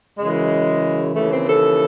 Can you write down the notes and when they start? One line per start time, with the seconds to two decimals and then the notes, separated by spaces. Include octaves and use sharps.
0.18 F#2 C#3 E3 G#3
1.14 D#2 C#3 E3 A3
1.31 C4
1.47 A4